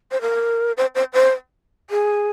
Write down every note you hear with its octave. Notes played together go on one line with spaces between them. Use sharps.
C5
A#4
C5
C5
C5
G#4